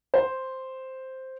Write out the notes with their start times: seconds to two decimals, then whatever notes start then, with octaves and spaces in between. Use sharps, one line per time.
0.14 C5